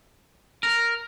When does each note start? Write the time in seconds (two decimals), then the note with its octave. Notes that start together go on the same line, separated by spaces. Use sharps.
0.63 A#4